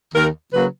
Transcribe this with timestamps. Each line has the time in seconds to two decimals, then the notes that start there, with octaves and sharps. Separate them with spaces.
0.14 D#2 A#4
0.53 C#3 F#3 A#3 B4